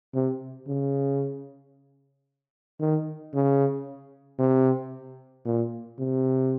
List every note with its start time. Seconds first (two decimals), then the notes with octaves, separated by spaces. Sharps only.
0.14 C3
0.67 C#3
2.80 D#3
3.34 C#3
4.39 C3
5.46 A#2
5.98 C3